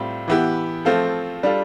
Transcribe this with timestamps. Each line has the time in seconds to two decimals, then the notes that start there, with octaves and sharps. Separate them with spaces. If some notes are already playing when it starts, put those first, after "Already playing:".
Already playing: A2 G3 C4 F4
0.28 E3 B3 E4 G4
0.85 F3 A3 C4 F4 A4
1.43 G3 D4 F4 A4